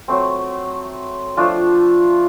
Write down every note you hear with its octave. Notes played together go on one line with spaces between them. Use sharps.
F#3 A3 C4
F3 A3 D4 F4